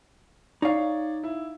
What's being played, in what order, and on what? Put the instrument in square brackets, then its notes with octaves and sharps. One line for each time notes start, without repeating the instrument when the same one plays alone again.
[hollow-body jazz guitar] D#4 F5 [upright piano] C#5 D5
[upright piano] E4